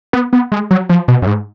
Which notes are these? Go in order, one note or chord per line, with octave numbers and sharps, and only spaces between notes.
B3
B3
G#3
F#3
F3
B2
F#2
G#2